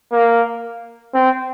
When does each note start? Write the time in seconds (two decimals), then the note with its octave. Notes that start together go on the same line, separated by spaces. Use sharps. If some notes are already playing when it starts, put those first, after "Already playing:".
0.13 A#3
1.14 C4